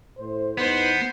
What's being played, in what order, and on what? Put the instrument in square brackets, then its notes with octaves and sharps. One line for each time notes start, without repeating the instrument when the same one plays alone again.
[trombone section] A2 C5
[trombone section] E2 D#4 B4 [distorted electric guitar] B3 [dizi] C5